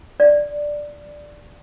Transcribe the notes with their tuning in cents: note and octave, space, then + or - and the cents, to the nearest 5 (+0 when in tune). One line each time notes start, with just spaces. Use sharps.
D5 +0